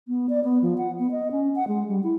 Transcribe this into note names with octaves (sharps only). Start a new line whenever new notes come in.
B3
D5
B3
F3
F#5
B3
D#5
C#4
F#5
G#3
G3
E4